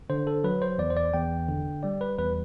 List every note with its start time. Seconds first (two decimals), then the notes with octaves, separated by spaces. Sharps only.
0.10 D3 C5
0.27 A4
0.44 F#3 B4
0.62 C5
0.78 E2 D5
0.90 C5
0.97 D5
1.14 E2 G5
1.49 D3
1.83 G3 D5
2.01 B4
2.18 E2 B4